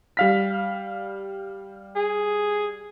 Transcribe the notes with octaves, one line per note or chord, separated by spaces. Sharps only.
G3 F5 B6
G#4